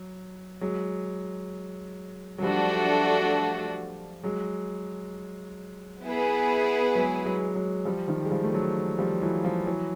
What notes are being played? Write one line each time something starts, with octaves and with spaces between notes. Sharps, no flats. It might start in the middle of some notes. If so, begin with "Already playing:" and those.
Already playing: F#3
F#3 G#3
F#3
F3 G3 A3 D4 F#4 A4
F#3 G#3
B3 E4 G#4 B4
F#3 G#3
F#3 G#3
F#3 G#3
F3 G3
D#3 F3
G#3
F3 G3
A3
F#3 G#3
F3 G3
E3 F#3
F3 G3
E3 F#3